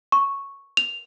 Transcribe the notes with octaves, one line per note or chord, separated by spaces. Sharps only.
C#6
F7